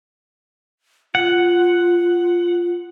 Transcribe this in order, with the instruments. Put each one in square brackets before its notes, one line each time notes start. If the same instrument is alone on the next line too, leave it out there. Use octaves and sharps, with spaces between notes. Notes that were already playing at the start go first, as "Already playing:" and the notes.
[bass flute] F4 [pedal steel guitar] F#5